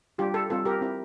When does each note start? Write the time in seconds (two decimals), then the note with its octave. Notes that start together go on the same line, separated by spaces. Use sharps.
0.18 G3 D4 F4 G4
0.34 A4
0.50 G3 C4 F4 A4
0.65 G4 A#4
0.81 C4 E4 G4